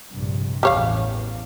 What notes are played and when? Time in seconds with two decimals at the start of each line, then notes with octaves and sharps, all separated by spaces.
0.11 A#1 G2 C3
0.63 A1 E2 G3 C#5 F5